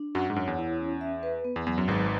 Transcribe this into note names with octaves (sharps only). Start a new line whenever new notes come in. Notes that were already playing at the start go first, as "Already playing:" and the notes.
Already playing: D4
F#2 F#3 F#5
G#2
F#2 C#5
E2
E4
C#4
E5
B4
B3
E2
E2 F#3
F#2
G#1 G#2 B4